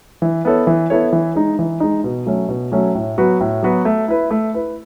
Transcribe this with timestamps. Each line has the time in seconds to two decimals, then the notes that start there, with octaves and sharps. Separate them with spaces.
0.22 E3
0.45 B3 E4 A4 C#5
0.67 E3
0.90 B3 E4 A4 C#5
1.13 E3
1.35 G#3 D#4
1.59 E3
1.80 G#3 D#4
2.04 B2
2.26 F#3 A3 C#4
2.49 B2
2.72 F#3 A3 C#4
2.95 A2
3.18 F#3 B3 F#4 B4
3.40 A2
3.63 F#3 B3 F#4 B4
3.85 A3
4.08 E4 B4
4.31 A3
4.54 E4 B4